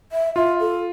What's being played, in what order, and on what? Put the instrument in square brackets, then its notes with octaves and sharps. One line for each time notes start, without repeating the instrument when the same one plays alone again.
[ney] E5
[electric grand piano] F4 [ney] E5
[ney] A4